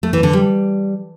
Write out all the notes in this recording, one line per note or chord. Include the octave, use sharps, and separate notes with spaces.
A3
E3
D3
G3